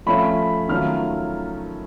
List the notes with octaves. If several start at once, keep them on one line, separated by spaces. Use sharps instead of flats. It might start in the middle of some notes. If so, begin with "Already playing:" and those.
F3 A3 C#4 F4 B5
D#3 F#3 A3 C#4 F4 F6